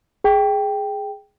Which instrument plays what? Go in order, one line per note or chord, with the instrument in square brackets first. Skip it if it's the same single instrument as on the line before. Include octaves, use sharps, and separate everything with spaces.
[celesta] G#4 G5